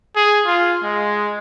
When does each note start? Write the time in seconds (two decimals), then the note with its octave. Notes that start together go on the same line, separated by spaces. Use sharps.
0.16 G#4
0.46 F4
0.84 G#3